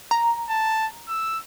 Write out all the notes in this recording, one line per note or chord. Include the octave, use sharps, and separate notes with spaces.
A#5
A5
E6